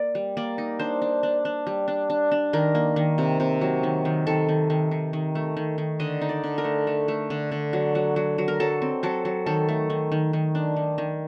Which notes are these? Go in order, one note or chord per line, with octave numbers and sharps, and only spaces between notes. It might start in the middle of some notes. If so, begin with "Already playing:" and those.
Already playing: A#3 D5
G3
A#3 D5
D#4
D4 C5
D4
D4
D4
G3
D4
D4
D4
D#3 A#4
A#3
D#3
C3
C3
F#3
D#3
D#3
D#3 A4
D#3
D#3
D#3
D#3
A3
D#3
D#3
D3 D#5
D#4
D5
D3
A#4
A3
A3
A3
D3
D3
F#3
F#3
F#3
F#3
A#4
F#3 A4
C4
F#3 A4
F#3
D#3 A4
A3
D#3
D#3
D#3
D4
D#3
D#3